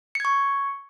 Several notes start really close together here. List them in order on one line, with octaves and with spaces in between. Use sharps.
C#7 G#6 C#6